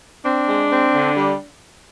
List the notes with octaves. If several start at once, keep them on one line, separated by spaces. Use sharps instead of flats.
C4 D4
G#3
C4
D3
G3